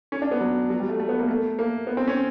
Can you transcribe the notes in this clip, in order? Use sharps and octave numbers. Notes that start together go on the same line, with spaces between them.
C#4
D4
B3
F#3
F#3
G3
A3
A3
B3
A#3
A3
A#3
B3
C4
C#4